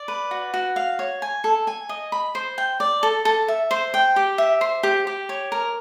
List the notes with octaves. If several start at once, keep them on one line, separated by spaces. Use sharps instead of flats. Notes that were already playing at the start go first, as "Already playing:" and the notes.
Already playing: D5
B4
F#4
F#4
F5
C#5
G#5
A4
G#5
D#5
B5
C5
G5
D5
A4
A4
E5
C5
G5
G4
E5
C5
G4
G4
C#5
A#4